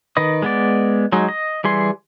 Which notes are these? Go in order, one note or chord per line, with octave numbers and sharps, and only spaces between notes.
D#3 B4 D#5 D#6
G#3 B3 D5
F#3 G#3 D#4
D#5
E3 G3 G#4 C6